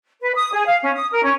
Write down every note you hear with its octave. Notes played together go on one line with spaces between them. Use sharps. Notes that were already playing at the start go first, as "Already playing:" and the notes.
B4
D#6
G#4
F5
C#4
D#6
A#4
C#4